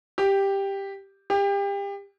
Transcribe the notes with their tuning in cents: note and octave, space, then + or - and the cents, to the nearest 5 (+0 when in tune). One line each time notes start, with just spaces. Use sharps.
G4 +5
G4 +30